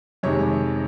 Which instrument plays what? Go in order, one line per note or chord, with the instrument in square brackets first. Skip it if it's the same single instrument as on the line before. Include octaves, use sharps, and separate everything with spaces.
[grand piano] F2 C3 D#3 G#3 C#5